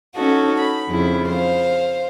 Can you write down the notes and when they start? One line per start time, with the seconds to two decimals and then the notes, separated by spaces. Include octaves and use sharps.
0.16 C#4 D#4 F#4 A4
0.58 B5
0.89 F2 C#3 E4
1.29 C5 F5